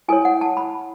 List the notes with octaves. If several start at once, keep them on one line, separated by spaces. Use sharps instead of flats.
E4 A4 C#5 G#5
F#5
A5
B5